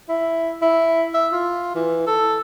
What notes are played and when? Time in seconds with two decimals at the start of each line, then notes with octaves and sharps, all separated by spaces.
0.09 E4
0.62 E4
1.14 E5
1.32 F4
1.75 E3
2.07 A4